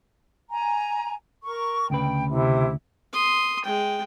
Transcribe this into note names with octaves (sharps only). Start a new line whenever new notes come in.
G#5 A#5
A#4 C#6
D2 C#3 B4 G5
C3 E4
C6 D#6
G#3 G5